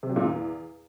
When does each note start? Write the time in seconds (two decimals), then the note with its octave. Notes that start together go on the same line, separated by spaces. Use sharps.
0.03 C3
0.09 F#3
0.16 A#2
0.22 E2